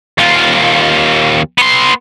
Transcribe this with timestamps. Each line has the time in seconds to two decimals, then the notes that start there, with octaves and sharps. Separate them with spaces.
0.18 D#2 F4
1.58 B3 C6